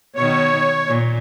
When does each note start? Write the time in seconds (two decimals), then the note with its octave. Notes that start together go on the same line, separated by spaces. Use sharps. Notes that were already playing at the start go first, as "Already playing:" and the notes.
0.16 B2 D#3 C#5
0.87 A#2